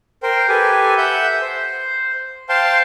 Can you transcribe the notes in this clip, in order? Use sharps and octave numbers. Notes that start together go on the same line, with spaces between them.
A#4 C5 G5
G4 A4 B4 G#5
E5 F#5 G6
C5
C5 F5 G5 A5 C6